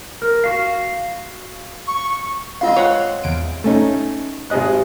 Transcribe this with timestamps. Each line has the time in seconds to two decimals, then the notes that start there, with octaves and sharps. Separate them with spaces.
0.22 A#4
0.44 F#4 F5
1.87 C#6
2.61 G#3 C4 F4 F5 C6
2.76 C#5 F#5
3.24 E2 D7
3.64 A3 C#4 D#4
4.50 G#1 C3 G#4 D#5 F#6